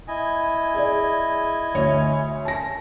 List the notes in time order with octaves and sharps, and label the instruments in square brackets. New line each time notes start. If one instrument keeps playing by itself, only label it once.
[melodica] E4 D#5 G#5
[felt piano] G#4 D5
D2 C#5 E5
[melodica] C#4 [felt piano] A5 A#6